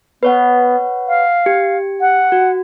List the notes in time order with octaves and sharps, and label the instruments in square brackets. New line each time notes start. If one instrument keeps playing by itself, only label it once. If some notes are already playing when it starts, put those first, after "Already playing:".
[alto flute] B3 [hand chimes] B4 C#5 F#5
[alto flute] F5
[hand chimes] G4
[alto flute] F#5
[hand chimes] F#4